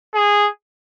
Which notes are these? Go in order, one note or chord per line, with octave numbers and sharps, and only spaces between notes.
G#4